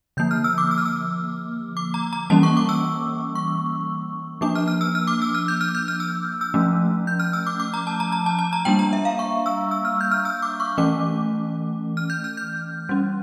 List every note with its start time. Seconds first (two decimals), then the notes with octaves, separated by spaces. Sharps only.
0.17 D3 F3 A#3 G6
0.31 F6
0.44 E6
0.58 D6
0.71 E6
0.78 F6
0.85 E6
1.77 D6
1.94 A#5
2.13 A#5
2.30 E3 G3 A#3 C#4 A5
2.43 C#6
2.57 D6
2.69 E6
3.35 C#6
4.41 F3 A#3 D4 D6
4.55 F6
4.68 F6
4.81 E6
4.95 F6
5.07 D6
5.22 E6
5.35 F6
5.48 G6
5.61 F6
5.75 G6
5.88 F6
6.00 E6
6.41 E6
6.54 F3 A3 C#4
7.07 G6
7.20 F6
7.33 E6
7.47 D6
7.60 D6
7.74 A#5
7.87 A5
8.00 A#5
8.12 A#5
8.26 A5
8.39 A5
8.53 A#5
8.65 G3 A#3 D4 G5
8.79 A#5
8.93 E5
9.05 F5
9.19 C#6
9.46 E6
9.71 E6
9.85 F6
10.01 G6
10.11 F6
10.25 E6
10.42 D6
10.60 C#6
10.78 E3 A3 C#4 D6
11.97 F6
12.10 G6
12.24 F6
12.37 G6
12.89 G3 C#4